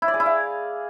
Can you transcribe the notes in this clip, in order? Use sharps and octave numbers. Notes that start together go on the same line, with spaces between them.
E4
D5
G#4
E4
F5